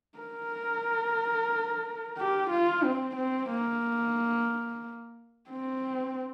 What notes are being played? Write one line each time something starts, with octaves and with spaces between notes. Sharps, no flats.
A#4
G4
F4
C4
C4
A#3
C4